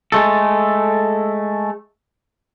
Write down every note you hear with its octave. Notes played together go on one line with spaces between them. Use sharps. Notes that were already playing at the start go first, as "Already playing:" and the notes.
G#3 A3 A4